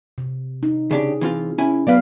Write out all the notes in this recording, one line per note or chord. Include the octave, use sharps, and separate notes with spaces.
C3
D#4
C#3 D4 G4 G#4
E3 C4 F4
C#4 E4 G#5
F#3 B3 B4 D5 F5